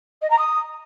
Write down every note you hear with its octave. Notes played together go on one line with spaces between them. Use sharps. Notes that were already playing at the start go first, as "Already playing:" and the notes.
D#5
A#5
D#6